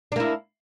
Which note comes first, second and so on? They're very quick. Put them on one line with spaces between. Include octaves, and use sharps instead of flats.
D4 A#3 E4